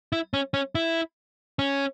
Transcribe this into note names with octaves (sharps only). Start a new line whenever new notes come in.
E4
C#4
C#4
E4
C#4